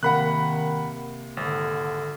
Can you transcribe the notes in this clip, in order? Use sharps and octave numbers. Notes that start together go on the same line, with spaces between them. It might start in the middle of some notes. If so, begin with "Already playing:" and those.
C3 D#3 A#3 F#5 B5 F#6
G#1 D3